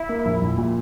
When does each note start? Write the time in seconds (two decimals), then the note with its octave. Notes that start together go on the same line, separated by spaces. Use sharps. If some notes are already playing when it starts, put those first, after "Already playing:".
Already playing: E4
0.09 A#3
0.25 A#1
0.41 A#1
0.58 A#2